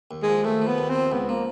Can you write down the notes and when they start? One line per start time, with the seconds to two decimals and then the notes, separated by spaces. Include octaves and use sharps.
0.11 D#2
0.22 G#3
0.28 F3
0.44 D#2 A3
0.62 F3
0.67 B3
0.78 D#2
0.89 C4
0.95 F3
1.12 C#2 B3
1.29 F3 A#3